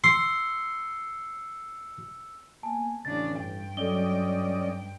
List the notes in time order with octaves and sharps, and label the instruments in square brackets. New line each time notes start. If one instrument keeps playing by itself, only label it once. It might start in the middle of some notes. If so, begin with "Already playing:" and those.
[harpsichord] C6 [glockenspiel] E6 C#7
[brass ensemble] A#3 B3 G#5 [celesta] A5
[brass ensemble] A1 [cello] C#3 D4 [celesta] A6
[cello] G2 G5
[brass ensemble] F#3 [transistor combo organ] C#4 D5 D#5 [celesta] A4 G7